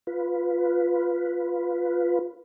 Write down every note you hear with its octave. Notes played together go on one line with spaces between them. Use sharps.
F4 B4